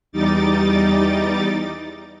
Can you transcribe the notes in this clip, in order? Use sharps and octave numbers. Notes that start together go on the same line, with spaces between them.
E2 G3 D#4 D6 A6